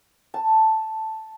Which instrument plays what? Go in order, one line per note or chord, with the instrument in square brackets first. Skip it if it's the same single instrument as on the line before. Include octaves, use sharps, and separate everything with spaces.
[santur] A5